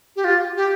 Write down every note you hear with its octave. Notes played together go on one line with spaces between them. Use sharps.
G4
F4
G4